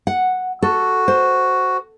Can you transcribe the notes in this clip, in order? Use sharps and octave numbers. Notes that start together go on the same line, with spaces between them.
F#5
F#4 A4
C5